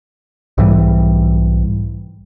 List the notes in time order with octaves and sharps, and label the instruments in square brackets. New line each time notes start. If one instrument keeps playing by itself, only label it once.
[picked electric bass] B1 G#2 E3 G3